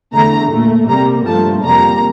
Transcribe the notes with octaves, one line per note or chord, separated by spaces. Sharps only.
E2 D3 A3 A#5
A#2 A3
C3 G3 A#3 A#5
G2 F3 A3 A5
F2 C3 G3 A#3 A#5